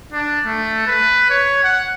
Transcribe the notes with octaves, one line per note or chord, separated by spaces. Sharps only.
D4
A3
B4
C#5
F#5